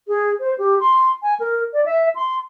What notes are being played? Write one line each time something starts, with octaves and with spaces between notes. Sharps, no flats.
G#4
C5
G4
C6
G#5
A#4
D5
E5
C6